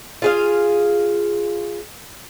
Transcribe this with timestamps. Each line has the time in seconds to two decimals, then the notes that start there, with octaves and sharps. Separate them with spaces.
0.22 F4 G#4 F5